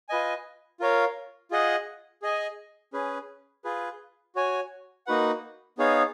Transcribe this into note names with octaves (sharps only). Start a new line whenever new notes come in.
F4 B4 D#5 G#5
F4 A#4 C#5 F5
F4 G#4 D#5 F#5
G#4 D#5 G#5
C#4 G#4 B4
F4 G#4 B4
F#4 C#5 G#5
A#3 D#4 F#4 B4 F#5
B3 D#4 G#4 C#5 F5